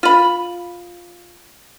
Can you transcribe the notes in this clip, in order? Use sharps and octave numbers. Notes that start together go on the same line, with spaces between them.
F4 B5